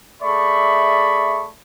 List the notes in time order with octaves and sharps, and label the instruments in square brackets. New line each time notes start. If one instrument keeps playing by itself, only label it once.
[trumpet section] A3 G#4 D5 E5 B5 C#6